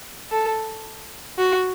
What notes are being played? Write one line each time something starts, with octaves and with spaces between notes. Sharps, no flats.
A4
F#4